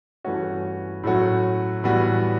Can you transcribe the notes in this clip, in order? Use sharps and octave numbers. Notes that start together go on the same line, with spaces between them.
G2 E3 A3 C#4 F#4
A2 F#3 A3 C#4 F#4
A2 E3 G3 B3 F#4